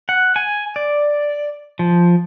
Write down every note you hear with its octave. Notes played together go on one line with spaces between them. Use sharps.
F#5
G#5
D5
F3